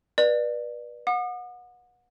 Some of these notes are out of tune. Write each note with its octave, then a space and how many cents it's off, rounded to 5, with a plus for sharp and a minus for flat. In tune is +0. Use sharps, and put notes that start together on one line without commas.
B4 -30 D5 +25
F#5 -30 D#6 -45